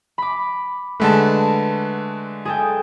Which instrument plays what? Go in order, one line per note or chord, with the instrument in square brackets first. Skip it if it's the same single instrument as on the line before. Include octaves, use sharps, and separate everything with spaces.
[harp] B5 D6
[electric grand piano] D3 G#3 A3 [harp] B4 F#5 A5
[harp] G#4 A4 G5